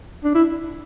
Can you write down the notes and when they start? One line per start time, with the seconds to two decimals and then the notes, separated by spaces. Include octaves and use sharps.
0.24 D4
0.35 E4